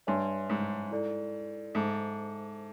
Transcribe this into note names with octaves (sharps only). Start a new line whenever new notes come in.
G2 C#5 E5 G#5 C6
G#2
E4 A4 D5
G#2 A4 C5 E5 A5 D6